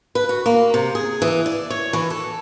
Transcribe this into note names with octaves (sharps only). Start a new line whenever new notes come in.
B4
F#4
A#3
C3
G#4
E3
D5
C#5
E3
A4